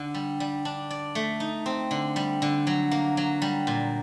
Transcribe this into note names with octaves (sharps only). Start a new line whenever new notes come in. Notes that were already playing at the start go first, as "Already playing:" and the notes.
Already playing: D3
G3
G3
D4
D5
A3
D#4
C4
D3
G3
D3
F#3
A#3
F#3
G3
A#2